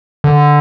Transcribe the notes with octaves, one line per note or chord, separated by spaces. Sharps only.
D3